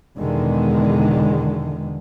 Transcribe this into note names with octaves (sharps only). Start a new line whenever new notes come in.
E2 B2 D3 D#3 G#3